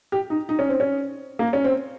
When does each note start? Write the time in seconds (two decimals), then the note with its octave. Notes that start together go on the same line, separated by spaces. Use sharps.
0.12 G4
0.30 D#4
0.49 D#4
0.59 C#4
0.69 C4
0.80 C#4
1.39 A#3
1.53 C#4
1.64 C4